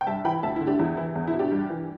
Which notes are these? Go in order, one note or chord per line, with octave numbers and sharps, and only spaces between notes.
G5
G2 E5 A5
E3 G5 B5
D2 E5 A5
D3 E4
D4 G4
E2 E4
E3 E4
E2
E4
B2
D4 G4
G2
E3